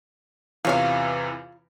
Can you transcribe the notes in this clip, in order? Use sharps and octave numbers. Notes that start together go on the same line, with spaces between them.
E2 C3 E3 F4 C#5 F5